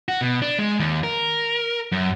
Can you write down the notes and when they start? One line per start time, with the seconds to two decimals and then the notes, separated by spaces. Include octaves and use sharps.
0.08 F#4
0.21 B2
0.42 D4
0.59 G#3
0.80 D#2
1.03 A#4
1.92 F#2